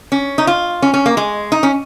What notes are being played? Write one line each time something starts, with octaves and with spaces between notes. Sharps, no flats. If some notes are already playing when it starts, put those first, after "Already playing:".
C#4
D#4
F4
C#4
C#4
A#3
G#3
D#4
C#4